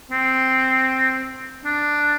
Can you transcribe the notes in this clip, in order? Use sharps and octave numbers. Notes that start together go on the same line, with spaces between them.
C4
D4